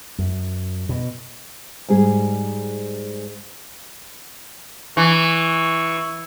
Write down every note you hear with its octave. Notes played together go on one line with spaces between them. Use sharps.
F#2
B2
G#2 G3 G#4
E3 C#6